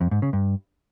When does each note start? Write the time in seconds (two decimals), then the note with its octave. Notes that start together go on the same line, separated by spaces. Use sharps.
0.01 F2
0.11 G#2
0.22 C#3
0.33 G2